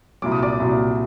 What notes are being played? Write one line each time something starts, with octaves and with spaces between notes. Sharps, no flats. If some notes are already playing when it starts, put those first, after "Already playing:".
C2 A#2 F#3 D6
D#6
D5 D6
C2 A#2 F#3